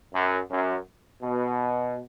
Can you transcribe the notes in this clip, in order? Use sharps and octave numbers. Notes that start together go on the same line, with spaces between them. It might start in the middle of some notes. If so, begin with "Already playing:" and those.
F#2
F#2
B2